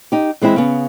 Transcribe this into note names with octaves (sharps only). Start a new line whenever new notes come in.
D#4 G4
E3 G#3 C4 E4
C#3 B3